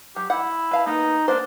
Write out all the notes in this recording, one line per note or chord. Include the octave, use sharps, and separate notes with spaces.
F#3 G4
E4 F#5
B4 F5 A5
A#3 B3 D#4
A#3 B3 D4 C5